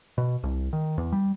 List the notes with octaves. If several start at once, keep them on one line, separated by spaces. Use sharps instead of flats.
B2
C2
D#3
E2
G3